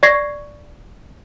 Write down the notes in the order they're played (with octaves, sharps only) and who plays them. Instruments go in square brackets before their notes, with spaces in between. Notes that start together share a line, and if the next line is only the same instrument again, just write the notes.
[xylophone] D5 C#6 G#6 A#6 C7